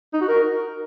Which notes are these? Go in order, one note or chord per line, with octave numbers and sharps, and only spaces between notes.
D#4
F#4
A#4